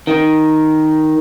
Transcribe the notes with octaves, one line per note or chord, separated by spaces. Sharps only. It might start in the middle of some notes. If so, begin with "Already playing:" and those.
D#3